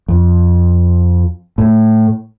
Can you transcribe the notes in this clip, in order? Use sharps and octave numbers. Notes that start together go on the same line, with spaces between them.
F2
A2